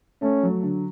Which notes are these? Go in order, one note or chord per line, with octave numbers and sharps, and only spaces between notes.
A3 C#4
F#3
D3